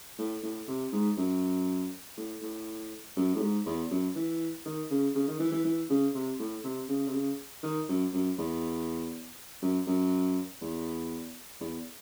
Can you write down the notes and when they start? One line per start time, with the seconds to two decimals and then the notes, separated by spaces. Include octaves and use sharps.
0.18 A2
0.43 A2
0.68 C3
0.92 G#2
1.17 F#2
2.17 A2
2.42 A2
3.16 F#2
3.35 A2
3.41 G#2
3.66 E2
3.91 F#2
4.16 E3
4.65 D#3
4.90 C#3
5.15 C#3
5.28 D#3
5.40 E3
5.52 E3
5.65 E3
5.90 C#3
6.14 C3
6.39 A2
6.64 C3
6.89 C#3
7.08 C3
7.13 C#3
7.63 D#3
7.88 F#2
8.13 F#2
8.38 E2
9.62 F#2
9.87 F#2
10.61 E2
11.61 E2